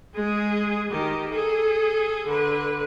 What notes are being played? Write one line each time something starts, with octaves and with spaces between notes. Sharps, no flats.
G#3 G#4
D#3 G4
G#4 A4
D3 B4